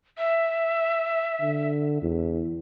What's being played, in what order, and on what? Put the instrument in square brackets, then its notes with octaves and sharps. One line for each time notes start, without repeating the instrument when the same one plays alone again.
[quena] E5
[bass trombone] D3
E2